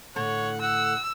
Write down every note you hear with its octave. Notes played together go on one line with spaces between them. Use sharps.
A2 D3 A4 C#5 F#5
F#5 E6